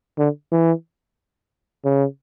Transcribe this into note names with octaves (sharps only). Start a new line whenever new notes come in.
D3
E3
C#3